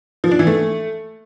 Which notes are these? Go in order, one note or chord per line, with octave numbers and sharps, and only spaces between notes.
F3
D4
E3
A3